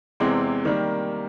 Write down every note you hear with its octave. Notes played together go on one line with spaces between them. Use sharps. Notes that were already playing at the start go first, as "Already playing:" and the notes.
E2 C3 E3 G#3 C4
D#3 G3 A#3